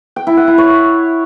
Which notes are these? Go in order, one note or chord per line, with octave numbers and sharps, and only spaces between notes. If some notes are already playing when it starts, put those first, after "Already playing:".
G5
E4
F#5
E4
C#5